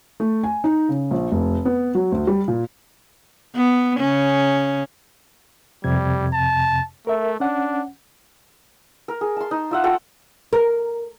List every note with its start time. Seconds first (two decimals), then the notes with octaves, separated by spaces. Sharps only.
0.20 A3
0.44 G#5
0.64 D#4
0.89 C#3
1.11 A#1
1.32 F1
1.65 B3
1.95 F#3
2.12 D2
2.27 G3
2.48 A#2
3.56 B3
3.99 C#3 C#4
5.84 F2 C3 G3 G#6
6.34 A5
7.07 A3 A#4 E5
7.40 C#4 D4 F#5
9.08 A#4
9.21 G#4
9.36 A5 C6
9.51 D#4
9.71 F4 E5 F#5
9.84 F4 A4 F#5 G5
10.53 A#4